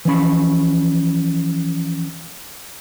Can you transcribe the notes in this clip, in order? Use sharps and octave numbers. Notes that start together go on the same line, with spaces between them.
E3 F3 C#4 B5